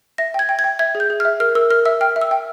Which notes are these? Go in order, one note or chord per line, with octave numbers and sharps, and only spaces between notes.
E5 A#6
G5 G#6
G5
G#6
G5
E5 G#6
G#4
G6
G#4
F6
E5
A#4 F6
A#4 E6
A#4 F6
E5 E6
G5 F6
E5
E6
G5